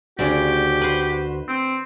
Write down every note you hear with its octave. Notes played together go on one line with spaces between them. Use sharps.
D2 C#3 F#4 G4 D5
B4 C5
C4